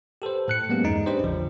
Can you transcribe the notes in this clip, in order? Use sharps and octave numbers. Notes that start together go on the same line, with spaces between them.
G4 A4 B4 C5
A2 F#6 C#7
F#3 G#3 A#3 B3 C#4 G4
E2 G2 G#3 D#4
C#4 D4 G4 B4 C5 D#5
A1 E2 C#3 F3